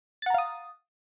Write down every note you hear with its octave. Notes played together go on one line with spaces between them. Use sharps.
F5 F#5 A#5 D#6 A6